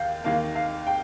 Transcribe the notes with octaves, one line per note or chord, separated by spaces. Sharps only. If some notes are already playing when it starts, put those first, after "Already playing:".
Already playing: D#2 A#3 F5 G6
D#2 D#3 A#3 F5
F5
G5